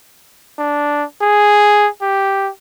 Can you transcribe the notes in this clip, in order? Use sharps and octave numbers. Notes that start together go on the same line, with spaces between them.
D4
G#4
G4